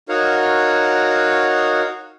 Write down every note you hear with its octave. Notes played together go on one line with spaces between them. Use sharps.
D#4 F#4 A#4 C#5 F5 F#5